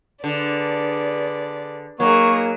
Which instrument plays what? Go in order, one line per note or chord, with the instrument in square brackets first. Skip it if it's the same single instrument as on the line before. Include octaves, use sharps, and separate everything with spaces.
[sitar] D3 [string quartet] G#4 B4 D5
[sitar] F#3 [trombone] A#3 [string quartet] D#4 G#4 A#4 [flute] C#6